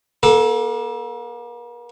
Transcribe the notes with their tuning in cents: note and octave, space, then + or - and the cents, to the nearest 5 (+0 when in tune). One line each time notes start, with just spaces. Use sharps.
A#3 +40 A4 -5